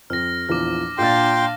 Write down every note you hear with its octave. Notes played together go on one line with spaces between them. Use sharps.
F2 F6 A#6
A#1 E2 F3 D6 F6
A#2 D4 F5 G5 C6 A6